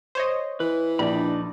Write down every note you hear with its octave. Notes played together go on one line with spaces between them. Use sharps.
C5 C#5 D#5
E3 B4
A#1 D4 D#4 B5